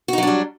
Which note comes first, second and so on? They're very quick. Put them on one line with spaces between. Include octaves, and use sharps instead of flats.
F#4 D#4 F#3 D4 G3